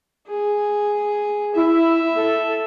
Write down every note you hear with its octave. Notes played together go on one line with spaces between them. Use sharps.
G#4
E4 E5
A4